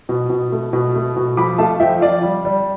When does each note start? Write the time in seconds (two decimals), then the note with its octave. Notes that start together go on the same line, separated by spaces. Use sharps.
0.09 B2
0.30 B2
0.52 A3
0.73 B2
0.95 A3
1.16 B2
1.37 F3 B5 D6
1.58 A3 F5 A5
1.80 F3 E5 G5
2.01 F3 D5 F5
2.23 G3
2.45 G3